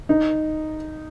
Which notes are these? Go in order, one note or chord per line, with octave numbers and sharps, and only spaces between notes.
D#4